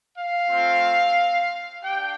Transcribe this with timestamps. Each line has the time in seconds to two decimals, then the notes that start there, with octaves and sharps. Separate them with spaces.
0.16 F5
0.50 A3 C4 F4
1.84 D4 G4 G5